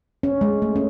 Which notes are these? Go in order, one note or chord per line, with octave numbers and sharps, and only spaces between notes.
C#4
G#3
A3
C#4